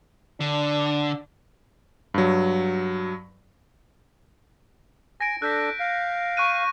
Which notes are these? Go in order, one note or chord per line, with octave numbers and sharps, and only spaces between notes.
D3 D4
G2 F#3
G#5 A#6 D7
D4 A4 F#6 G6 B6
F5
C#6 F#6 D#7